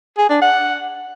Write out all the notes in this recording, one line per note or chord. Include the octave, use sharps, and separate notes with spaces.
G#4
D4
F#5